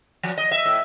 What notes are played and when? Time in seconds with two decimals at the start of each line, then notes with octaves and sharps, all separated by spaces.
0.23 F3
0.37 D#5
0.51 E5
0.65 A2